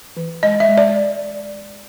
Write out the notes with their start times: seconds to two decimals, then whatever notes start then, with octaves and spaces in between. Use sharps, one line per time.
0.17 E3
0.43 G#3 D#5
0.60 E5
0.69 G#3
0.78 D5